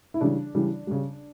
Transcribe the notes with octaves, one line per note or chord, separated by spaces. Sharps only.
E4
C#3 E3 G3 D4
C#3 E3 G3
C#3 G3